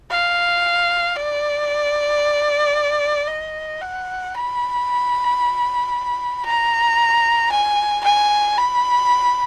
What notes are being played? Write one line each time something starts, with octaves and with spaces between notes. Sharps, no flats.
F5
D5
D#5
F#5
B5
A#5
G#5
G#5
B5